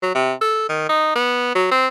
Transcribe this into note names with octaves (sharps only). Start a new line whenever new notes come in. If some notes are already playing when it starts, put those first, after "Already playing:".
F#3
C3
A4
D#3
D#4
B3
F#3
C4